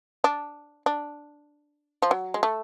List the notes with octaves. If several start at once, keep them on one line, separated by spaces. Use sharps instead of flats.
D4
D4
F3
F#3
G#3
A3